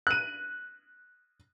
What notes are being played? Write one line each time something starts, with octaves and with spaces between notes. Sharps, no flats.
F#6 D#7